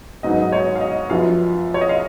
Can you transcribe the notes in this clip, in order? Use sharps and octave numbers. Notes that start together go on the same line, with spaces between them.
G#2 F#3 B3 D#4 D#5
D#5
C#5
F5
D#5
F#2 F3 B3 F5
C#5
D#5
F5